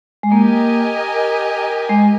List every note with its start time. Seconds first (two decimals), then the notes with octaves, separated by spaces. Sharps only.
0.23 G#3
0.32 A#3 G4 A#4 D#5 G#5
1.89 G#3